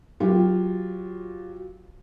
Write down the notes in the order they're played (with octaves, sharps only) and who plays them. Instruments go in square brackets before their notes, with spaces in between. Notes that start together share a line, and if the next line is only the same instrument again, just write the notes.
[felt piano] F#3 F4 G4